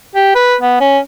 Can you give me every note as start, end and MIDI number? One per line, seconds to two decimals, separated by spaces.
0.15 0.33 67
0.35 0.55 71
0.61 0.76 59
0.80 0.99 61